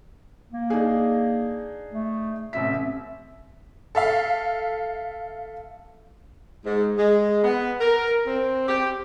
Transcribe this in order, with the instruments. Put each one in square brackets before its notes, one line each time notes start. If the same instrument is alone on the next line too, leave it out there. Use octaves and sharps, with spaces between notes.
[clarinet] A#3
[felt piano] D4 D#4 G#4
[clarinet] A3
[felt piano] A1 C3 B6 [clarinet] E5
[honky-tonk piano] A4 E5 F5
[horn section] G#2
G#3
B3
A#4
C4
G4